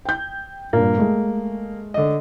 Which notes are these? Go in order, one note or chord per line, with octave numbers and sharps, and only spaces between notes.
G5 G6
G2 A#2 A#3
G#3 A3
D3 D#5